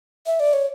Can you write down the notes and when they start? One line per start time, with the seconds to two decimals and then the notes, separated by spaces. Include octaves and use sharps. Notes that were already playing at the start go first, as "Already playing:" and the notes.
0.26 E5
0.40 D5
0.53 C#5